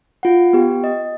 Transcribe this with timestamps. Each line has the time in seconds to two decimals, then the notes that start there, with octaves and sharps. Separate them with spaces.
0.23 F4 F#5
0.53 B3 G4
0.84 D#5